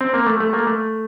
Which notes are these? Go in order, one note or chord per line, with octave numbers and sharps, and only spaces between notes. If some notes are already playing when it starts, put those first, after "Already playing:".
C4
A#3
A3
A3
A#3
A3